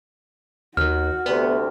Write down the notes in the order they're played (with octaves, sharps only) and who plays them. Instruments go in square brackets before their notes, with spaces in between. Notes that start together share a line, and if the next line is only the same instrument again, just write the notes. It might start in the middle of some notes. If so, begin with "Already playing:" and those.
[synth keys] D#2 D#3 [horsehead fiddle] F#4 [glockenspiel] F6
[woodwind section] D2 C3 [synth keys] B3